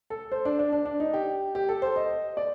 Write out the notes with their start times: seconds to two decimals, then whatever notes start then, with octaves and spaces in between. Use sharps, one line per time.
0.10 A4
0.32 C5
0.45 D4
0.59 D4
0.72 D4
0.85 D4
1.00 D#4
1.14 G4
1.55 G4
1.69 A4
1.82 C5
1.96 D#5
2.37 D5